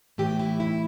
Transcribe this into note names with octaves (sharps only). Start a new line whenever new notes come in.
A2 E3 G4
E4
E4